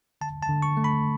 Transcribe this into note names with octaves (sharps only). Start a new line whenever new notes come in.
D3 A5
A5
D3
C#6
A3
B5